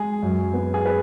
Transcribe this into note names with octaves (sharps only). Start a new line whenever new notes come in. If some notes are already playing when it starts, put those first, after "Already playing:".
Already playing: G#3 G#4
F#2
B3
G#4
B4